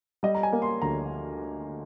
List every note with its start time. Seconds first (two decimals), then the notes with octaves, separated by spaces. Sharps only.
0.23 G3 D#5
0.35 A#5
0.43 G#5
0.53 A#3
0.62 C6
0.82 D2 A#5